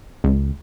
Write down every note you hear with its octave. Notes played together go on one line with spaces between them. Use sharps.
C#2